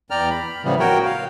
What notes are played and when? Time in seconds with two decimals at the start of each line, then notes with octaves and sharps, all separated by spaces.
0.10 E2 D5 G5 A#5 F6
0.30 B5
0.64 A2 C#3 E3 F3 G3 B3
0.79 F#4 A#4 C#5 G5
1.05 F5